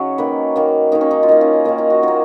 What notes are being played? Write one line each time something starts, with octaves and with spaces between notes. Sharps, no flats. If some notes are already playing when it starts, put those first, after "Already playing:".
Already playing: C#3 F#3 D#4 G#4 C#5
D#3 A#3 B4
D#3 A#3
D#3 A#3 D#4
C#4
D#4
F4
D#3 A#3 D#4
C#4
D#4
D#3 A#3 D#4
D#4
F#4
D#3 A#3 F4